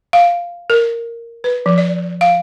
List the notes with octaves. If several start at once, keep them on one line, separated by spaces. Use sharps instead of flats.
F5
A#4
B4
F3
D5
F5